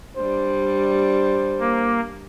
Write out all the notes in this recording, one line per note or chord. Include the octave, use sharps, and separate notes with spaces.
G3 D4 C5
A#3